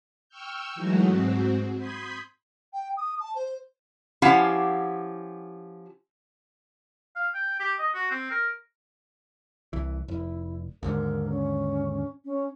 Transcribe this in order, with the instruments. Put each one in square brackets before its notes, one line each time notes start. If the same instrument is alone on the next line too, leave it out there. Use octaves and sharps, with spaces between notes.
[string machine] G5 C#6 E6 F6 G6
E3 F#3 G#3 A3 D#4 F#4
G#2 C4 F#4
B5 C6 D#6 G6 G#6 B6
[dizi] G5
D#6
A5
C5
[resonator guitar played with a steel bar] F3 C#4 E4 G4 F5 F#5
[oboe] F5
G5
G4
D#5
F#4
C4
A#4
[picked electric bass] C2 E3
[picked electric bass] F1 [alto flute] E4
[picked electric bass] D#2 G#2 D3 [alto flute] A#4
[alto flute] C#4
C#4